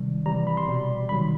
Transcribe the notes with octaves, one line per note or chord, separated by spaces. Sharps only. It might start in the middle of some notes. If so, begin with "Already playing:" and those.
Already playing: C3 D#3 G3
C3 E3 G3 A#5
B5
C6
B2 G3
C3 D#3 F#3 B5